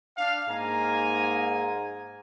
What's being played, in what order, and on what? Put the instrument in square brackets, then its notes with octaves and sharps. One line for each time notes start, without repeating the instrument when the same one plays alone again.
[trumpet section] D4 F5
[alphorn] G#2 [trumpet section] A#3 G#5 A#5